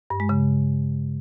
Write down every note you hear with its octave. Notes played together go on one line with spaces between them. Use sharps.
G2
G#3
C#3